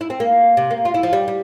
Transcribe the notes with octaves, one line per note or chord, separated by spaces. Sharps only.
E4
C4
A#3
C3
A#3
F4
E4
F3
G3
G3